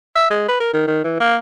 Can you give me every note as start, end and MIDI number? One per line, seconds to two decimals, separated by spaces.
0.15 0.29 76
0.30 0.44 56
0.48 0.58 71
0.60 0.73 70
0.73 0.86 51
0.87 1.03 51
1.04 1.17 52
1.20 1.36 58